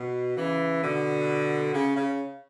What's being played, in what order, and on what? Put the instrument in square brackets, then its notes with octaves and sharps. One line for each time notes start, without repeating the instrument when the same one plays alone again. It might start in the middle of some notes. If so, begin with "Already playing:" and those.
Already playing: [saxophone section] B2
C#3 E3
B2 D3
C#3
C#3